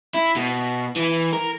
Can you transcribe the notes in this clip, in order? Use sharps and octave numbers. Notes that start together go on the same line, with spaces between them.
E4
B2
E3
A#4